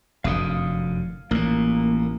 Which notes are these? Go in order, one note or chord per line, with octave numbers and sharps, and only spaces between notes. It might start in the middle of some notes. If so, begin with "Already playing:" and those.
F1 F#2 D3 F5 D#6
A1 A#2 A#3